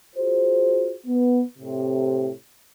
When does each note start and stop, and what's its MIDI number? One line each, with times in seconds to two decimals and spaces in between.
0.16 0.93 65
0.16 0.93 66
0.16 0.93 68
0.16 0.93 72
1.06 1.42 59
1.59 2.30 45
1.59 2.30 48